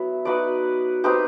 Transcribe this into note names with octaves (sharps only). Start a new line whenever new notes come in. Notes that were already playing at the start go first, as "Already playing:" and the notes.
Already playing: F#3 B3 E4
D#4 F#4 B4 D5
C4 D#4 G4 B4